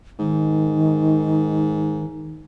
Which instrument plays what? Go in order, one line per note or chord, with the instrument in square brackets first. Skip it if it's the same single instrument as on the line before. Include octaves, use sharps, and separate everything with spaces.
[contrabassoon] G#2 [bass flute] D#3